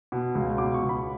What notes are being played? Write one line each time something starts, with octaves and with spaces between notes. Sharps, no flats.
B2
C#2
B2 D6
C#6
C#2
B5